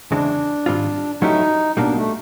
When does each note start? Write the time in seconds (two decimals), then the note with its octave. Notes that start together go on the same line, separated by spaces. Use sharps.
0.11 E2 C#3 E3 G#3 C4 D4
0.66 G#2 D#3 G3 C4 F4
1.22 F#3 A3 C#4 D#4 E4 G4
1.77 B1 B2 G3 A#3 D4
1.96 A3